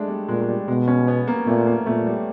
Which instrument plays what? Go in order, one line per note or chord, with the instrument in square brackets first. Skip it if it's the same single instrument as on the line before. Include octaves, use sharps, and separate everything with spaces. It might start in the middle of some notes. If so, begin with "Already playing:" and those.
Already playing: [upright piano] G#3 A3 D4
G3
[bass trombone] A#2 [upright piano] G#3
[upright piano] G#3
G3
[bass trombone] B2 [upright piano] G#3
[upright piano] C#4
B3
A#3
[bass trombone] A#2 [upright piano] A3
[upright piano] A#3
[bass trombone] A#2 [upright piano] A3
[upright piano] G3